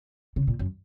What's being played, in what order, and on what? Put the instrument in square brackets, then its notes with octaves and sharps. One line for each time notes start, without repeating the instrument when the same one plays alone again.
[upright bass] C#3
A#2
F#2